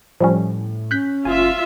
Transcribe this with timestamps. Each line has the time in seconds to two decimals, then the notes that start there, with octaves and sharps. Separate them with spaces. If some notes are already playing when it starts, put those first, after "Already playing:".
0.21 A2 F3 G3 C#4
0.91 C#4 F#6 G6 B6
1.25 F#1 F4 E5 G#5